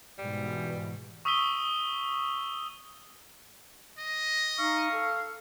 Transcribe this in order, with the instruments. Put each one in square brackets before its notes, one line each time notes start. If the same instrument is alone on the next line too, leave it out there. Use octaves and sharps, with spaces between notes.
[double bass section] G#2 B2 E3 [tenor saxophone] G3
[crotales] C#6 D#6 E6 B6 D#7 G7
[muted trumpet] D#5
[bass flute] D#4 [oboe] F5 [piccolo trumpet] C#6
[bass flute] A4